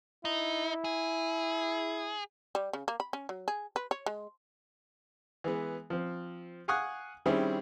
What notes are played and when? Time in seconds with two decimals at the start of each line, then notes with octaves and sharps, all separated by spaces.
0.25 D#4 E4
0.84 G#4
2.55 G3
2.73 C#3
2.88 A#3
3.00 B5
3.13 C#4
3.29 F#3
3.48 G#4
3.76 B4
3.91 C#5
4.06 G#3
5.44 E3 G#3 B3
5.90 F3 C4
6.68 F5 F#5 G#5 C#6 D#6 F#6
7.26 D#3 G3 C4 C#4 E4 G#4